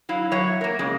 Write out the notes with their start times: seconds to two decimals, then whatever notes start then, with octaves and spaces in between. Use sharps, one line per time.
0.09 F#3 E4 F5
0.31 F#3 C#5 E5 F#5
0.61 A#3 A#4
0.79 F2 C#3 G#3